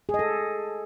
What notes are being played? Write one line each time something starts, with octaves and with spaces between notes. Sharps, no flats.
G#4
D#5
A4